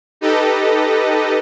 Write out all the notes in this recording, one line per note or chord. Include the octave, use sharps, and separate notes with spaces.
D#4 G4 A4 B4 D#5